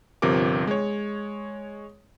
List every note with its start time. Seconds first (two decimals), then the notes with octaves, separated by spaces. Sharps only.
0.22 G1 C3 F3 C4 A#4 D6
0.67 G#3 C#5